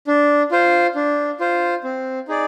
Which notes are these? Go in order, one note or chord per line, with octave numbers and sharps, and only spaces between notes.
D4
F4 C5
D4
F4 C5
C4
D#4 G#4 D5